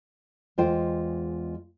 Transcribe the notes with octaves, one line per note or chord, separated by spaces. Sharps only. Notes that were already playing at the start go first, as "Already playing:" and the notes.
E2 G#3 F4 C5 G5